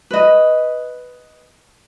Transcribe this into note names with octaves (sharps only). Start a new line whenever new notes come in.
B4 D#5